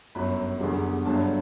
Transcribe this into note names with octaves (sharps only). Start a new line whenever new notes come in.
G1 F#2 F#3 B5
F#1 E2 D3 G3
G1 G2 D3 F#3 A5